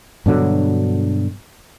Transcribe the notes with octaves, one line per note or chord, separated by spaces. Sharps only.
G2 B2 D3 F#3